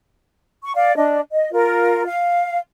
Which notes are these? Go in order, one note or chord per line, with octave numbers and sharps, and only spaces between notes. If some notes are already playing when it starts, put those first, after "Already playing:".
C#6
D5 F5
D4 D#5
D#5
F4 A#4
F5